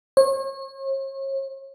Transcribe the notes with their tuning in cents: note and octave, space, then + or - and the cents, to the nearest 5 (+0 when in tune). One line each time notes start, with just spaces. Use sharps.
C#5 -40